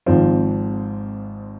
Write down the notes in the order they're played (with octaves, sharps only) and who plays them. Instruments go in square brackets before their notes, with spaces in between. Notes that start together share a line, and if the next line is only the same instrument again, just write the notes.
[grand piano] G#1 G#2 F3 C4 F4